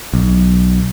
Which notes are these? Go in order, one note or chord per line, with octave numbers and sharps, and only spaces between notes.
B1